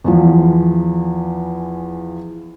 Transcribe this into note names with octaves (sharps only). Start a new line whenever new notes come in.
E2 E3 F3